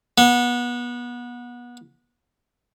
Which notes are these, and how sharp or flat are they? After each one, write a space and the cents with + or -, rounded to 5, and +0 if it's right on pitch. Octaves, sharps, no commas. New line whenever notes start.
B3 -25